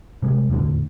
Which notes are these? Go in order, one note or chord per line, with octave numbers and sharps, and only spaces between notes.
C3 G3 G#3
E1 D2 A2 D3